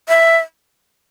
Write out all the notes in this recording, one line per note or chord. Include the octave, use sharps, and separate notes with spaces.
E5